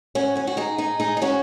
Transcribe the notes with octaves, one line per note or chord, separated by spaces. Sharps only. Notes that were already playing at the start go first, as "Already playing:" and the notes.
C#4 F#4
C#4 F#4
F#4
D#4 G#4
D#4 G#4
D#4 G#4
D#4
C#4 F#4